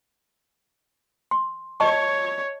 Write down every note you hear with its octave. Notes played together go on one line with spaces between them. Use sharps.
C6
C#5 D#5 A5 C#6